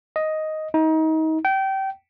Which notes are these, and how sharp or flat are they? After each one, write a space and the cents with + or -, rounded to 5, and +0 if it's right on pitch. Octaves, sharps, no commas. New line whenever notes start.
D#5 +5
D#4 +30
G5 -25